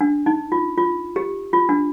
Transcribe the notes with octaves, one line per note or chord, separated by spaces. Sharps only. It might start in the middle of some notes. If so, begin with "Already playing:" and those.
D4
D#4
F4
F4
G4
F4
D4